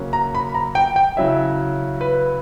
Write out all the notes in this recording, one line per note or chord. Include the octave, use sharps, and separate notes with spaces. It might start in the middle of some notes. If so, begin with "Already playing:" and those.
Already playing: C#3 F#3 A#3 C#4
A#5
B5
A#5
G5
G5
C#3 F#3 C#4 E4 E5
B4